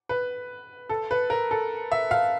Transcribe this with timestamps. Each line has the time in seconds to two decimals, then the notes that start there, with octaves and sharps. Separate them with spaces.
0.09 B4
0.89 A4
1.11 B4
1.30 A#4
1.51 A4
1.92 E5
2.11 F5